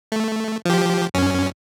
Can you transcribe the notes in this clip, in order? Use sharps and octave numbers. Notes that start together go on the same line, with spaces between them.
A3
F3 G4
F#2 C#4